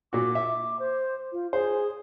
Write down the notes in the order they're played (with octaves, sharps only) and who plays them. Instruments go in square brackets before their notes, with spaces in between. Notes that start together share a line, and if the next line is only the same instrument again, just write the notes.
[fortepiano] A#2 F#4 [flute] D6
[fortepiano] E5
[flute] C5
F4
[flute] G#4 [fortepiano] C5